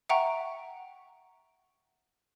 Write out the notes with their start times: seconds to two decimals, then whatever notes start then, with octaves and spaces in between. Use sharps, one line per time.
0.09 E5 F#5 G5 A#5 C#6